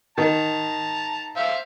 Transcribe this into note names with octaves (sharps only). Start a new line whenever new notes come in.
D#3 A5 A#5
C5 E5 F5